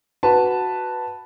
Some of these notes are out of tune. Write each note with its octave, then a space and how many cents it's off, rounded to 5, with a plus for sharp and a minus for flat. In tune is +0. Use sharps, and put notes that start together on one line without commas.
F#4 +0 B4 +0 A5 +0